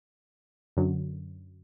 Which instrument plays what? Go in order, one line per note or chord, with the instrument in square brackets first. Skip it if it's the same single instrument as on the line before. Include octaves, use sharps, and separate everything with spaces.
[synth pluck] F#2 D3 F#3